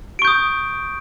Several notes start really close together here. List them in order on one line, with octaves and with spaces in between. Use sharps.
D7 C#6 G6 D#6